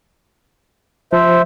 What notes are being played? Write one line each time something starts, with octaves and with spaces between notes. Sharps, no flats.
F3 C5 E5